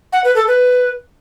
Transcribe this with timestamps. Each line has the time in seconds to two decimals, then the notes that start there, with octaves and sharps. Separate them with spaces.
0.13 F#5
0.24 B4
0.36 A4
0.48 B4